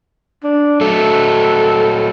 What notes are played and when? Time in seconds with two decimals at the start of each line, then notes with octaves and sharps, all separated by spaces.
0.44 D4
0.81 F#3 A3 A4